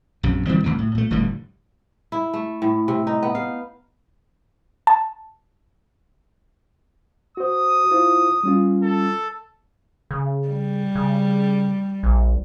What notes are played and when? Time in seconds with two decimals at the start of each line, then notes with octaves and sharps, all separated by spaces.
0.23 A#1 F#2 C3
0.47 D#3 G3 C4
0.64 C2 F2 A2 C3
0.78 A2
0.95 A#2 A3
1.10 F1 A2 D3 G3
2.12 E4
2.33 A3
2.62 A2
2.88 C3
3.07 D#4
3.22 B3
3.35 F5
4.87 A5
7.37 F#4 C5 D#6
7.91 E4 F4 C5
8.43 G3 C#4 F4
8.83 A4
10.11 C#3
10.48 G3
10.95 C#3
12.03 A#1